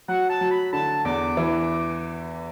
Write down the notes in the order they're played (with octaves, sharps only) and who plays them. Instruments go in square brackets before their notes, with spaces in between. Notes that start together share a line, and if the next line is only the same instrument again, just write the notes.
[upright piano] F#3 [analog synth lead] F#5
[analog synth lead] A5
[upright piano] F#3
[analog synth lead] B5
[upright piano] D3 [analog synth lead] A5
[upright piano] E2 [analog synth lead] D6
[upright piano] E3